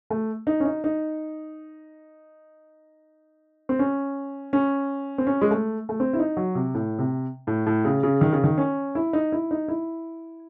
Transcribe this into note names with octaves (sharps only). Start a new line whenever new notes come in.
A3
D#4
C#4
D#4
D#4
C4
C#4
C#4
C4
C#4
G#3
A3
A3
C4
E4
D#4
F#3
C3
A2
C3
A2
A2
C#3
C#3
D#3
C#3
D#3
C#4
E4
D#4
E4
D#4
E4